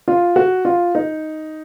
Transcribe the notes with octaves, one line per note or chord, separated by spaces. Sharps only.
F4
F#4
F4
D#4